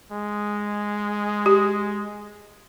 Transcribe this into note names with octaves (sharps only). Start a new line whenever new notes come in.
G#3
G4